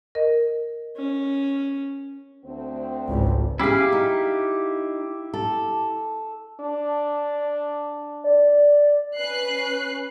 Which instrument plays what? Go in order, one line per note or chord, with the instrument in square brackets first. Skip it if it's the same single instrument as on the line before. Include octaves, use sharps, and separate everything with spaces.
[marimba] A#4 D#5
[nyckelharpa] C#4
[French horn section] D2 C4
[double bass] G#1 C#2
[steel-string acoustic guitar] C#4 G#4 [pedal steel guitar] E4 G4 F5
[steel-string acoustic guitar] D#4
A4
[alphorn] D4
[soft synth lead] D5
[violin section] C#4 B4 F#6 C7